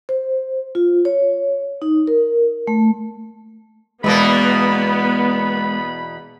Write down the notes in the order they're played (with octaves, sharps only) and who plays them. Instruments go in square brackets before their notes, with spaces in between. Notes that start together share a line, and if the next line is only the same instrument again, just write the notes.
[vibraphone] C5
F4
C#5
D#4
A#4
A3
[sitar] E2 B2 A#3 [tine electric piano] G#3 [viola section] B3 [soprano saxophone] B5